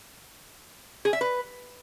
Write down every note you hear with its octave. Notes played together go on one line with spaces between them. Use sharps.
G#4
E5
B4